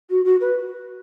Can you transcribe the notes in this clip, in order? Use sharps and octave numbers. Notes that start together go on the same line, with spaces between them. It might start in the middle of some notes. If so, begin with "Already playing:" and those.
F#4
F#4
B4